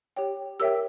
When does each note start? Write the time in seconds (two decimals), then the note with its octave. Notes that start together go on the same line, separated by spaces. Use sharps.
0.16 G4 C#5 G5
0.60 G4 A#4 C#5 E5 G5 E6